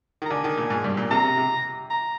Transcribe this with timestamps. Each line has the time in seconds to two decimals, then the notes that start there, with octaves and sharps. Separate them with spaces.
0.22 D#3
0.26 A#5
0.30 D3 G#5
0.44 D#3
0.57 A#2
0.70 G#2
0.84 G2
0.97 A#2
1.11 C3 A#5
1.24 C3
1.37 C3
1.90 A#5